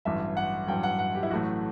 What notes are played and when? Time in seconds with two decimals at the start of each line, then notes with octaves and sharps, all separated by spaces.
0.05 A1 G2 F#3 E5
0.37 F#5
0.67 A1 G2 F#3 G5
0.83 F#5
0.99 F#5
1.15 G4
1.23 E4
1.30 A1 A2 F#3 A3 F#4